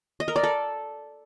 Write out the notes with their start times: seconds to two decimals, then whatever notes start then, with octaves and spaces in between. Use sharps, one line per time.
0.20 D#5
0.28 A#4
0.36 D5
0.43 A4